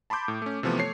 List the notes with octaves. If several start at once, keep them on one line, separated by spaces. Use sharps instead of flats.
A5 B5 C6 D6 G6
A2
A3 C#4
C3 E3 F3 A3 B3
A3 C#5 C7